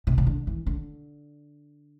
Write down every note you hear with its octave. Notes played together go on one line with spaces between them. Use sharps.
C3
C3
D3
E3
D3